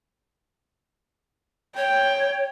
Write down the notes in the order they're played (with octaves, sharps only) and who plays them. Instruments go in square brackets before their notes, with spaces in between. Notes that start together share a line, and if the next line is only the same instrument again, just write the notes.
[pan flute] C#5 [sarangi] G5